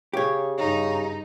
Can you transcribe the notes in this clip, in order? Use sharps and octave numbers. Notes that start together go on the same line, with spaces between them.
C#3 G4 C#5
G2 C#3 D#4